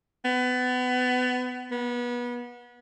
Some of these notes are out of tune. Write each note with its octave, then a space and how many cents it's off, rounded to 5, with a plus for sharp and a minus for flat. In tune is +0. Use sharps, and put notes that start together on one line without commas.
B3 +25
B3 -30